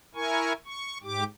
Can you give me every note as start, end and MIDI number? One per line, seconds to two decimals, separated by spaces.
0.15 0.53 64
0.15 0.53 70
0.15 0.53 80
0.15 0.53 85
0.66 0.98 85
1.03 1.24 44
1.03 1.24 67
1.03 1.24 86